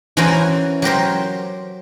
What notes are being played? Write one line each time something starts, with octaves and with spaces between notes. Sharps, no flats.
E3 C#4 E4 F#4 A#4 C5
F#3 G4 A#4 C5